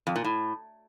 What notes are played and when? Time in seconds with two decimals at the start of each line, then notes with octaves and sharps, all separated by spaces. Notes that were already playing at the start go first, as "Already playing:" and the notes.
0.07 F2
0.16 A#2
0.24 A2